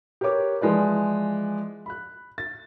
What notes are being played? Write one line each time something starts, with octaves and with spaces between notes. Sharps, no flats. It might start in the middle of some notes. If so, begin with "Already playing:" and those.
G4 A#4 B4 C#5 D6
E3 F3 G#3 B4 D5
B5 F#6
A6